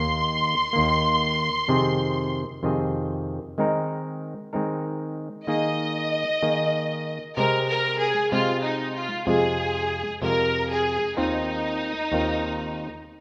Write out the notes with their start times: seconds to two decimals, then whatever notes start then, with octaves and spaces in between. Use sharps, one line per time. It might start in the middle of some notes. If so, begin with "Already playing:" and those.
Already playing: D#2 D#3 A#3 C6
0.73 D#2 D#3 A#3
1.68 F2 C3 D#3 C4 G#4
2.63 F2 C3 D#3 C4 G#4
3.58 D#3 G#3 C4 D#4 A#4
4.53 D#3 G#3 C4 D#4 A#4
5.47 D#3 A#3 D#4 G#4 D#5
6.42 D#3 A#3 D#4 G#4
7.37 C3 G#3 C4 A#4
7.68 A#4
8.00 G#4
8.32 C3 G#3 C4 F4
8.64 D#4
8.96 F4
9.27 F2 C3 F3 G#3 F4 G#4
10.22 F2 C3 F3 G#3 F4 A#4
10.69 G#4
11.17 D#2 D#3 C4 D#4 F4 A#4
12.12 D#2 D#3 C4 F4 A#4